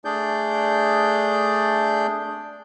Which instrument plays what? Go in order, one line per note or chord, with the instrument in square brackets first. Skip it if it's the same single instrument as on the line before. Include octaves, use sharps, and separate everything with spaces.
[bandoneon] A3 D4 G#4 D5 G6